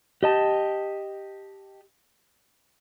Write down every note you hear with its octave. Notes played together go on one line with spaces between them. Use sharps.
G4 D#5 A5